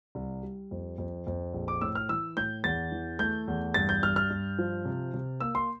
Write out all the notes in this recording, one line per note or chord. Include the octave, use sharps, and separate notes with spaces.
C2
G3
F2
F2
F2
A#1
D6
A2 E6
F6
E3 E6
A2 G6
E2 A6
E3
A3 G6
E2
G2 A6
G6
G2 F6
F6
G2
F3
C3
C3
A#3 E6
C6